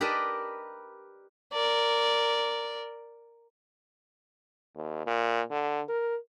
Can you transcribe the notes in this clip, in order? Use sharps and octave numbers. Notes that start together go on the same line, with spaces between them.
G4 A#4 B4 D5 D#5 A5
A#4 D5
D#2
A#2
D3
A#4